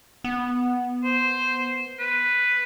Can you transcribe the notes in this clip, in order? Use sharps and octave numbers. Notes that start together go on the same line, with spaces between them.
B3
C5
B4